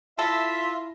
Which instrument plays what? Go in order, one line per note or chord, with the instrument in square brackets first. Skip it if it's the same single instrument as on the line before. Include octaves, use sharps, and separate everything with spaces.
[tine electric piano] E4 B5 A#6 [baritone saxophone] F4 [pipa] A4 [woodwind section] E5